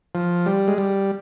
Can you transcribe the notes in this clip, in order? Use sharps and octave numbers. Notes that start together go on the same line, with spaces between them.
F3
G3
G#3
G3